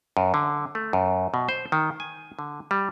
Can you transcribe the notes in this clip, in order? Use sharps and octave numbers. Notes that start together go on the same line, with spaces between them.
F#2
D3
A3
F#2
B2
C5
D#3
G#5
D3
G3